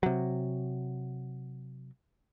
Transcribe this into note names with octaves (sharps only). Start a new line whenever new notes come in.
C3 F#3